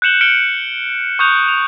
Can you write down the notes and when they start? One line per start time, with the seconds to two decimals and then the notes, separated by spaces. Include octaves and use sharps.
0.02 F#6 G6 C#7 E7 F#7 G7
0.21 F6 C#7 D7 E7 G7
1.19 C#6 D#6 F#6 G6 F7
1.48 F7